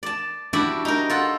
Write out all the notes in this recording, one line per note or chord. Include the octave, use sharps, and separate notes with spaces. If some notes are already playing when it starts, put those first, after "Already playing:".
D5 A5
G3 D4 E4 F#4 D5
D#4 A#4
F4 A4 F#5